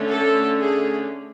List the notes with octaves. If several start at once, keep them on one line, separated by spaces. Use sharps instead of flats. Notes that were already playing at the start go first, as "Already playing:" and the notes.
Already playing: D3 A3 C#4
A4
G#4